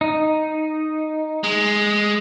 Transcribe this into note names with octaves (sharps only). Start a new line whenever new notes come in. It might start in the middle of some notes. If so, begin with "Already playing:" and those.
D#4
G#3